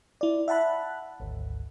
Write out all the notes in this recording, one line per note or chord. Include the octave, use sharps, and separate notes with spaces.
E4 D5
E5 F#5 A5 B5 F#6
G#1 D2